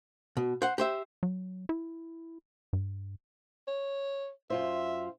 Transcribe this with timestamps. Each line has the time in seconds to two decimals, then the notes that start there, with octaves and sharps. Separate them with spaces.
0.37 B2
0.62 C5 F#5
0.78 G4 C5 E5
1.23 F#3
1.69 E4
2.73 G2
3.67 C#5
4.50 F#2 F4 C5 E5